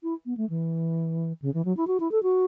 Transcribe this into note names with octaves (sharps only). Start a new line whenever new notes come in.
E4
B3
A3
E3
C#3
E3
F#3
E4
F#4
E4
A4
F#4